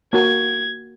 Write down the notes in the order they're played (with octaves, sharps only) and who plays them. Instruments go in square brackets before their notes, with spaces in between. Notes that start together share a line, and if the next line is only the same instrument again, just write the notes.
[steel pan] A#3 F#4 A#4 [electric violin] G#6